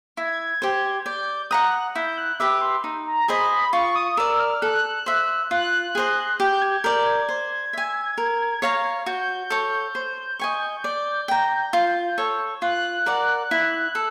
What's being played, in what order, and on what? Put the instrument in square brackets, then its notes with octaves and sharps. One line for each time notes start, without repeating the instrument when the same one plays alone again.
[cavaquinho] E4 [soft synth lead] G#6
[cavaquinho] G4 C5
[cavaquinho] D5 [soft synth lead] G6
[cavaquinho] F#5 A#5 D#6 [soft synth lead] F#6
[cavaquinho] E4 [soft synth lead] G6
[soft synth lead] F#6
[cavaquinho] G4 B4 E5 [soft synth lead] D6
[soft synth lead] C6
[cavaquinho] D#4
[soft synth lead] A#5
[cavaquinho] G#4 C5 D#5 [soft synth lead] B5
[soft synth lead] B5
[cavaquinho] F4 [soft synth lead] C#6
[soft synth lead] D#6
[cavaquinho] A#4 D5 [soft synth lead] E6
[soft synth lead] F6
[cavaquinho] A4 [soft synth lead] F#6
[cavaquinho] C5 E5
[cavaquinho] F4 [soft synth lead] F#6
[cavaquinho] G#4 C5 D#5
[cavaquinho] G4 [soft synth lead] G6
[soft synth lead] G#6
[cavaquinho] A#4 D5 [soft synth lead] G6
[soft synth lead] G#6
[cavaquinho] C5
E5 G#5
A#4
C#5 F5 A#5
[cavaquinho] F#4 [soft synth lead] G6
[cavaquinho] A4 C#5
C5
D#5 G#5 C#6
D5
G5 A#5
F4
A4 C#5
[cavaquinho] F4 [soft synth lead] F#6
[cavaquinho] A#4 D5 F#5
E4
A4